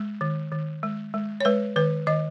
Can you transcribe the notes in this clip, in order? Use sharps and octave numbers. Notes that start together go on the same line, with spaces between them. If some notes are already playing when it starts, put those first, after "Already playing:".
Already playing: G#3
D#3
D#3
G#3
G#3
C#5
G#3 B4
D#3 B4
D#3 D#5